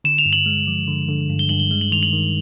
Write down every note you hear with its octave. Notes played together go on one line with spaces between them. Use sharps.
D3 E7
F7
G2
F#7
G#3
F3
D3
D3
G2
G7
G2 F#7
G7
G#3 G7
F#7
D#3 F7
F#7
D#3